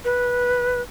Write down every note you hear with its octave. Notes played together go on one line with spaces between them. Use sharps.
B4